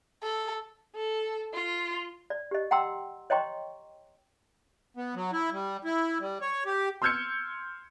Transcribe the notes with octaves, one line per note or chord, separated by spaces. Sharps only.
A4
A4
F4
D5
G4 D#5
F#5 G5 A#5 C6 E6
C#5 D#5 G5 A#5 C6 C#6
B3
F#3
E4
G3
E4
G3
C#5
G4
C6 E6 F6 G6 G#6 C#7